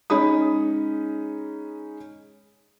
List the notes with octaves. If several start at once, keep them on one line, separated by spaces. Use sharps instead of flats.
G#3 C#4 D#4 B5 D#6